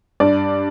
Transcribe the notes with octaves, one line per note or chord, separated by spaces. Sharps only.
G2 D5